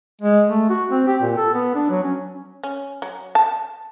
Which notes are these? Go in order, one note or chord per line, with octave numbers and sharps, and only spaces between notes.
G#3
A3
F#4
C4
G4
A#2
A4
B3
D4
F#3
C#4
C#4
F#3
A5